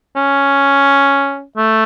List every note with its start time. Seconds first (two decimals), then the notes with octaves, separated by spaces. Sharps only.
0.16 C#4
1.57 A3